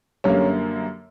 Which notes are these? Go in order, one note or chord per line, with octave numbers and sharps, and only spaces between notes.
F#2 D3 G3 A#3 C#4